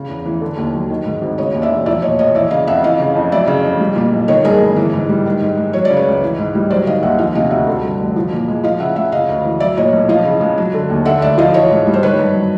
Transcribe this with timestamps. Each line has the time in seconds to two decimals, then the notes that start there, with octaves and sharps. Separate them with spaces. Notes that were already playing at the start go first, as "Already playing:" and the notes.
Already playing: C#3
0.09 E2
0.26 E3
0.41 D3
0.57 D#2
0.74 F#3
0.90 D#3
1.06 G#2
1.22 G#1
1.38 C#3 C#5 D#5
1.54 D#2
1.62 D5 E5
1.71 E1
1.86 F3 D5 E5
2.02 A#2 C#5 D#5
2.19 A#1 C#5 D#5
2.35 E3 D5 E5
2.51 C#3 D#5 F5
2.67 F2 E5 F#5
2.84 E3 D#5 F5
2.99 C#3
3.16 F2
3.32 F#3 D5 E5
3.47 C#3
3.64 F2
3.80 G3
3.96 A#2
4.13 B1
4.28 D#3 C#5 D#5
4.44 G2 G#4 A#4
4.61 G1
4.76 E3
4.94 G#2
5.09 G3
5.26 D#3
5.42 G#2
5.57 G#3
5.73 F#3 C#5
5.85 D5
5.90 C#3
5.97 B4 C#5
6.07 C#2
6.22 E3
6.38 G#2
6.55 G3
6.70 F#3 C5 D5
6.86 D#3 D#5 F5
7.02 D#2 E5 F#5
7.18 F3 D#5 F5
7.35 C3 D#5 F5
7.51 D2 E5 F#5
7.67 D3
7.83 G2
7.99 A1
8.16 F3
8.32 A#2
8.48 G#3
8.64 F3 D#5 F5
8.80 C#3 E5 F#5
8.96 G#3 E5 F#5
9.12 C#3 D#5 F5
9.29 D2
9.44 E3
9.60 F#3 D5 E5
9.77 A#2 C#5 D#5
9.93 B1
10.09 F3 D#5 F5
10.25 C#3
10.41 G#3
10.58 F#3
10.74 D3
10.90 D#2
11.05 D3 E5 F#5
11.22 D2 D5 E5
11.38 F3 D#5 F5
11.54 E3 C#5 D#5
11.71 G#2
11.87 G3
11.94 C5
12.02 D#3 B4 C#5
12.19 G2
12.34 F#3